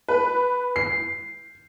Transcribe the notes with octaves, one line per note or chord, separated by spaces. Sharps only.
B4
C7